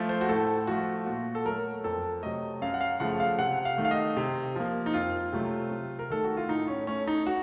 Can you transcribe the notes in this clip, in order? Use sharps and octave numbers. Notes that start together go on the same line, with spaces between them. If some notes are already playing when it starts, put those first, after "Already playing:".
Already playing: F3 A3
C5
F#4
A2 A4
F3 A3 F#4
A#2 F#4
A4
F#3 A3 A#4
F2 A4
C3 F#3 A3 D#5
F#2 F5
F#5
F5
C#3 F3 A3 F#5
F5
C3 F#5
F5
D#3 A3
F5
D#5
C3
F3 A#3
D#4
F2 F4
C3 F#3 A3
C3
A#4
D#3 A3 A4
F#4
F4
A2 D#4
C#4
A3 C#4
D#4
F#4